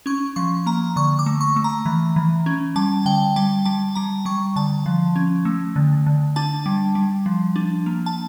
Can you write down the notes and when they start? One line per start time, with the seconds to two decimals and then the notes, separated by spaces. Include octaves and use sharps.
0.06 C#4 C#6
0.36 F3 C#6
0.66 A#3 A#5
0.96 D3 C#6
1.19 D6
1.26 A3
1.41 C#6
1.56 A3
1.64 A#5
1.86 E3
2.16 E3
2.46 C#4
2.76 G3 A5
3.05 D3 G5
3.36 G3 A5
3.65 G3 A5
3.95 G3 A#5
4.25 G3 C#6
4.56 D3 A5
4.86 F3
5.16 C#4
5.45 A3
5.76 D3
6.06 D3
6.36 D4 A5
6.66 G3
6.95 G3
7.26 F3
7.56 D4
7.86 A#3
8.06 A5